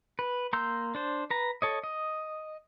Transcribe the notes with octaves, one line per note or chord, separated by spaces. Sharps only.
B4
A#3 A#5 C6 E6 G6
D4 C5
B4 A#5
A4 C#5 D#5
D#5